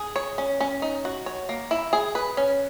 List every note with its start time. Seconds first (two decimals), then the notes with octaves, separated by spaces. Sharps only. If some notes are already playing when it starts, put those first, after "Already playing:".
Already playing: G#4
0.16 C#5
0.38 C#4
0.60 C#4
0.82 D#4
1.05 F#4
1.26 C#5
1.49 A#3
1.71 E4
1.93 G#4
2.15 B4
2.37 C#4